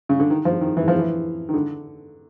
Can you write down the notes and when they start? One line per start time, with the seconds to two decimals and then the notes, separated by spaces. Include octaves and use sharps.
0.09 C#3
0.20 D3
0.30 D#3
0.45 F3
0.61 D#3
0.77 E3
0.88 F3
0.99 E3
1.49 D#3
1.54 D3